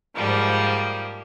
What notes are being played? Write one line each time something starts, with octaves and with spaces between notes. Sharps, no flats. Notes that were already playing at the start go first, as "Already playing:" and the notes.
G#2 F3 G3 A#3